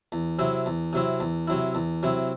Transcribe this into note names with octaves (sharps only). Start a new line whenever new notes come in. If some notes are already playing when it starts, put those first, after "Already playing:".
E2
C3 F#3 C4 E4
E2
C3 F#3 C4 E4
E2
C3 F#3 C4 E4
E2
C3 F#3 C4 E4